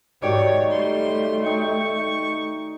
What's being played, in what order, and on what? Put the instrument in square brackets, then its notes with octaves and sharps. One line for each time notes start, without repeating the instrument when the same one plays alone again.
[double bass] G#2 [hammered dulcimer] D#3 F#3 [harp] G4 D5 D6 [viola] C#5
[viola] G3 C6 [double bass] A3
[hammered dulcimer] D#4 G5 [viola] C#6